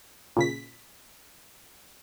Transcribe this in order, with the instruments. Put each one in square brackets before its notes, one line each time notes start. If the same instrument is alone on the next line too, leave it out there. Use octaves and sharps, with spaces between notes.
[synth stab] A#2 C#3 B6